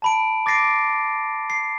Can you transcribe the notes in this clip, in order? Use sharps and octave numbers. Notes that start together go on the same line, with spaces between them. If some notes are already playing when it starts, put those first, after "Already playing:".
A5 B5 D7
D6 A6 A#6 C7 D7
C7